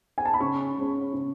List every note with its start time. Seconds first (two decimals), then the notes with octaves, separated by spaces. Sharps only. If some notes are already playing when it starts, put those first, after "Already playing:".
0.18 G#5
0.25 A5
0.34 B5
0.40 C#3 C#6
0.77 G#3 C#4
1.13 C#3